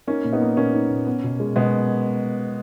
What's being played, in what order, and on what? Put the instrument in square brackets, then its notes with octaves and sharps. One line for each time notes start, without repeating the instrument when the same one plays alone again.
[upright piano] A#3 C#4 [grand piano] D#4
[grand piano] A#2
[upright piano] B3 D#4
[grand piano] A#3
[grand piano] A#2 [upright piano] A#3 C#4
[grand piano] D#4
A#2
B3
B2
G#3
[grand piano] B2 [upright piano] G#3 B3